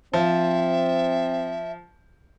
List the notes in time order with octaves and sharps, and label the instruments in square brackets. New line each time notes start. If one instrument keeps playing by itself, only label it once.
[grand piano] F3 [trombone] C4 [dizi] E5